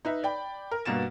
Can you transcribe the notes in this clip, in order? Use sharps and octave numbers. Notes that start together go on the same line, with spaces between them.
D#4 B4 E5
D5 G5 B5
A#4
G2 B2 A#3 F#4 A6 E7